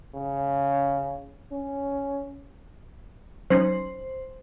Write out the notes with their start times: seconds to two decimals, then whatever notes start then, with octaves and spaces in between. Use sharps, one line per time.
0.15 C#3
1.52 C#4
3.50 F#3 C#4 D#4 C5